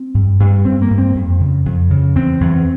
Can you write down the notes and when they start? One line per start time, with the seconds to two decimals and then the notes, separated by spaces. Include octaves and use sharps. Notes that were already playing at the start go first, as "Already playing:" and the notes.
Already playing: C4
0.14 G2
0.40 G2
0.65 G2 C4
0.82 A#3
0.90 G2
0.98 C4
1.15 F2
1.40 C#3
1.66 F2
1.91 C#3
2.16 E2 C4
2.41 E2